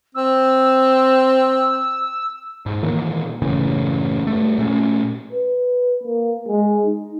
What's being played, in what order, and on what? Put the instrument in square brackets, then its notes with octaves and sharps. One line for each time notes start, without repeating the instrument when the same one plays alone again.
[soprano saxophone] C4 [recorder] E6
[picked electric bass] G#2
A#2 D#3 E3 A#3
F#1 A2 C#3 E3
G2 A3
A#2 A3 C#4
[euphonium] B4
A#3
G#3
D#4